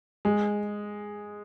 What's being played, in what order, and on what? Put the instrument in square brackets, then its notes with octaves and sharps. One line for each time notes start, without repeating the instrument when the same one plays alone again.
[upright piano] G#3